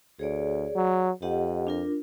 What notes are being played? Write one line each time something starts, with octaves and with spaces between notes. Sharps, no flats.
D2 G#4 C#5 D5
F#3
F2 G4 D#5 F#5
D4 F4 A#4